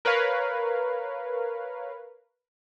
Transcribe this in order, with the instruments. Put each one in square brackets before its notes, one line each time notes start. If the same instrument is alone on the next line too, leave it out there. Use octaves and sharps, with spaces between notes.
[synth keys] A#4 B4 C#5 F5